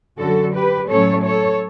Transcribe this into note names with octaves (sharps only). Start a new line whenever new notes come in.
F#2 D3 F#3 F#4 A4
G4 B4
A2 F#3 A3 C#4 A4 C#5
A4 C#5